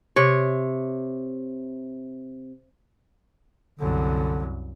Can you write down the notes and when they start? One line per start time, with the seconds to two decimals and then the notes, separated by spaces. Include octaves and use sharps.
0.16 C3 C#5
3.79 C2 F#2 D3